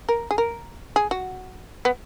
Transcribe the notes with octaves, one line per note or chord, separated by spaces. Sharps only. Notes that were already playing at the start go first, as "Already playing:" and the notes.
A#4
G#4
A#4
G#4
F#4
B3